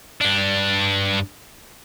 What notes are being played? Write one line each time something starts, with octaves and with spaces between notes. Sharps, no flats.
G2 D4